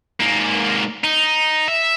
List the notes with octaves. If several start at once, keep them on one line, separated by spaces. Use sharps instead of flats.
G#2 A#3
D#4
E5